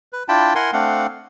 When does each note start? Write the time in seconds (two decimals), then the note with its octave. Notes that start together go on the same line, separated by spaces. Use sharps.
0.13 B4
0.29 D4 E4 F4 G5 A5 B5
0.55 E4 A#4 F#5 G#5 C6
0.73 A3 C4 D4 F5 F#5